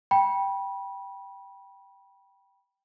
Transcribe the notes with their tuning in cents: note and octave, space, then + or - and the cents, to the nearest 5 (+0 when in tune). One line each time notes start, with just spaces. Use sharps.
G5 +0 B5 -25